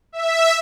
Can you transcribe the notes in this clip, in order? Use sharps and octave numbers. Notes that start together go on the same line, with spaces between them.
E5